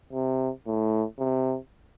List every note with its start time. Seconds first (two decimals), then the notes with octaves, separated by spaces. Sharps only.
0.13 C3
0.67 A2
1.19 C3